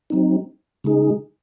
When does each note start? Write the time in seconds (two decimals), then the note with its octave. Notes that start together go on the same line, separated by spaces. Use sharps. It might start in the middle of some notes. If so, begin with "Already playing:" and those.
0.10 F#3 C4 D#4
0.84 C#3 G#3 D#4 G#4